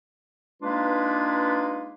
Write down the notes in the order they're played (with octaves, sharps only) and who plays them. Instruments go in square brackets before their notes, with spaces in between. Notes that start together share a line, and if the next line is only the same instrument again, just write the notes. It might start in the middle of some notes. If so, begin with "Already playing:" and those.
[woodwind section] G#3 A#3 D4 D#4 F4 B4